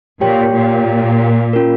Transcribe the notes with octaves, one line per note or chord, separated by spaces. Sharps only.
A#2 G4 C#5 G5
A#2
C#4 F4 A#4